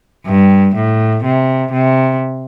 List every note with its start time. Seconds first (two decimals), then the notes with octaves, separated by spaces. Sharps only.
0.26 G2
0.75 A2
1.25 C3
1.72 C3